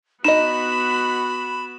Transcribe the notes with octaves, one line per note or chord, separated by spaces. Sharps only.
B3 D#4 F#4 D#5 B5 E7